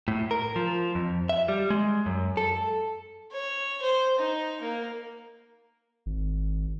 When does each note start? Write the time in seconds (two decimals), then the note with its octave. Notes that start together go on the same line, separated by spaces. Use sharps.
0.08 A2
0.31 A#4
0.56 F3
0.95 F2
1.29 E5
1.48 G3
1.70 G#3
2.06 F#2
2.37 A4
3.32 C#5
3.82 C5
4.18 D#4
4.61 A#3
6.06 G#1